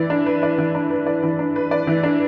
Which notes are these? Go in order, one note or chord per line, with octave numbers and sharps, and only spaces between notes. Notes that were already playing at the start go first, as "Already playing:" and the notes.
Already playing: E3 D5
D4
B4
D5
E3
D4
B4
D5
E3
D4
B4
D5
E3
D4